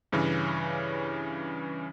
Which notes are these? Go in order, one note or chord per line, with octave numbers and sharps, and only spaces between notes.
G2 C#3 E3 C#4